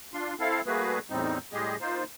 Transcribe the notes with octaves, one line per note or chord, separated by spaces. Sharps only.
D4 F4 C6
C4 E4 A4 F5
G3 A3 A#3 F#4 G#4 B4
E2 A2 G3 C4 D#4
A2 G3 G#3 G4 G#4 D#5
A#3 D#4 F4 C5